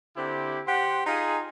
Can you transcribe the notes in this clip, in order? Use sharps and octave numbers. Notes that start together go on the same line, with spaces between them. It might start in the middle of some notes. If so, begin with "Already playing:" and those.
D3 C4 E4 G4
G4 C5 F#5
D#4 F4 G#4